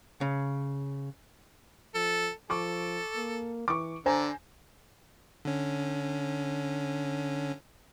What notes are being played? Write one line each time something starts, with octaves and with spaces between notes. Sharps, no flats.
C#3
F3 A4
F3 A4 C#6 D6
A#3
E3 C#6 D6
D3 D4 C5 G#5 A#5
D3 C#4